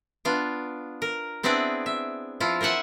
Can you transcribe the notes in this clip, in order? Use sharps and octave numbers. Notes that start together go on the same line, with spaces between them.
B3 D4 F4
A#4
B3 C4 D4 E4 G#4 D5
E5
F3 E4 F4
A#4 C5 E5 F#5 G#5